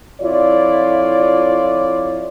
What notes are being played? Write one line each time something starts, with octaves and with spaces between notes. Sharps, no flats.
F2 E4 F4 C#5 D5